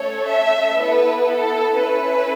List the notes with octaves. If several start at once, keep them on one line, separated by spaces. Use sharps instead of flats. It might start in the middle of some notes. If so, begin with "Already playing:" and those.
Already playing: A3 C#4 A4 C#5
E5
B3 E4 A4 B4
A4
C#4 E4 A4 B4